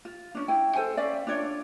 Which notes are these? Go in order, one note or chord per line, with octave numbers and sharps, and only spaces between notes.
F4
C#4 D4
E4 G5
A4 C5 G#5
C#4 D5 E5 F5
D4 F4 C#5 D5